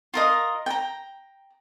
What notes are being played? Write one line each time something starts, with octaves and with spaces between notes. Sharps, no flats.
F4 A#4 D#5
G5 A#5